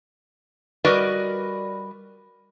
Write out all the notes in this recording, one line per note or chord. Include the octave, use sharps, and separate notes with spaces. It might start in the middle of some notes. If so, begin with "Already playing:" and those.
G3 F#4 A#4 B4 D5 D#5